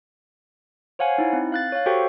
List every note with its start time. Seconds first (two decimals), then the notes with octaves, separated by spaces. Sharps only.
0.99 C5 C#5 F5 F#5 G#5
1.18 D#4 E4
1.33 C4
1.52 F5 F#6 A6
1.72 C#5 F5
1.86 F#4 G4 A4 C5 G5 C#6